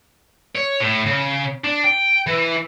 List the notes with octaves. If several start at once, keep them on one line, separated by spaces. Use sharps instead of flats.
C#5
A2
C#3
D4
G5
E3